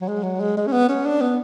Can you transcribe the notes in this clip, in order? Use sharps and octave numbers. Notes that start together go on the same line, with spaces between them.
F#3
G#3
F#3
G#3
G#3
C#4
B3
C#4
D4
B3